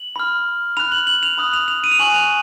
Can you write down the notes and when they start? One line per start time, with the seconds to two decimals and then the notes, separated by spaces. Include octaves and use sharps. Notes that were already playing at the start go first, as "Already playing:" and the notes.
Already playing: F#7
0.16 B5 F6
0.77 B5 F#6 F7
0.92 F#7
1.07 F#7
1.23 F7
1.38 B5 D#6 F#6
1.53 F7
1.68 F7
1.84 D#7
1.91 F7
1.99 G#5 C#6 F#6 F#7
2.10 D#7
2.14 F7